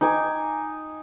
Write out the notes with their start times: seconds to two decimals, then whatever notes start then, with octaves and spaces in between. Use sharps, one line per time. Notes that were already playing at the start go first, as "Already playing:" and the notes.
0.01 D#4 G#5 D6